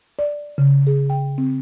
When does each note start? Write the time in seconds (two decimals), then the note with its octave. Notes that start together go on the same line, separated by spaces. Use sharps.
0.19 D5
0.58 C#3
0.87 G#4
1.10 G5
1.38 C4